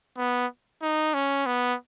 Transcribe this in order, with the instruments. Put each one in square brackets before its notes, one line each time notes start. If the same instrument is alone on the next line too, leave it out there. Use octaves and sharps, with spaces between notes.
[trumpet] B3
D#4
C#4
B3